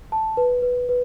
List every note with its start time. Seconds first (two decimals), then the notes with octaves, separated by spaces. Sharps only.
0.12 A5
0.37 B4
0.62 B4
0.89 B4